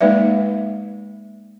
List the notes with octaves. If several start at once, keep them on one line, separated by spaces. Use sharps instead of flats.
G#3 A#3 D#4 B4 D5 E5